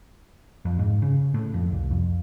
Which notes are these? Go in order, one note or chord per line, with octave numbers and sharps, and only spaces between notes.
F2
G#2
C#3
A2
F2
C2
F2